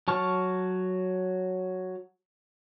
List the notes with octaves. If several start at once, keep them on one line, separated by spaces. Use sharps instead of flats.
F#3 A5 C#6 F6